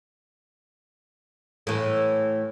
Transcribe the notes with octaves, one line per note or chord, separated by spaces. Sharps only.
A2 E3